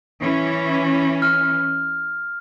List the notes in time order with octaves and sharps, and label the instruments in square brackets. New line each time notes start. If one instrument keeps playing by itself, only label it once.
[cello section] E3 C#4
[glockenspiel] F6